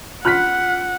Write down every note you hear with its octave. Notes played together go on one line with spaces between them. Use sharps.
C#4 F4 F#5 C6 F6 F#6 B6